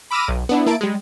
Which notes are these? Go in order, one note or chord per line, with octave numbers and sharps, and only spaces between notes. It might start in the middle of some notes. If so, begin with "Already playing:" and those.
B5 D6 E6 F6 A#6 D#7
B1
B3 D4 E4
A#3 E4 A5 D7
G3 G#3